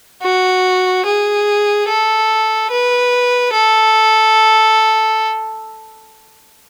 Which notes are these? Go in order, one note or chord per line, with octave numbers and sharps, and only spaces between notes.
F#4
G#4
A4
B4
A4